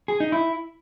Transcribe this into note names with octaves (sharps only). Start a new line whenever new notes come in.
G#4
D#4
E4